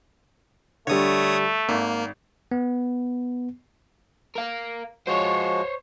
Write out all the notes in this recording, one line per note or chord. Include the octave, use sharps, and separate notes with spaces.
D3 G3 A3 C#5 D#6
G#1 A#3
B3
A#4 F5
F3 G#3 F#4 C5 C#5